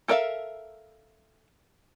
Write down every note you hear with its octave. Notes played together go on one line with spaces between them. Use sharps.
A4 A#4 D5 E5 F5